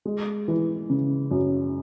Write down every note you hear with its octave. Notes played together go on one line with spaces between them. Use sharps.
G#3
E3
C#3
F#2